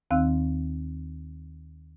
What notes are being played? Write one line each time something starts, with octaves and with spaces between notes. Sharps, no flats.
D#2 D#3 C4 F5 E6 F#6